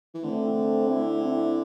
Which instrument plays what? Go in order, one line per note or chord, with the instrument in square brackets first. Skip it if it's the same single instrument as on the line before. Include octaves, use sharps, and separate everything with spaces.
[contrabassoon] E3
[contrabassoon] D3 [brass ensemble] A3 C4
[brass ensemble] C4 E4
C4 E4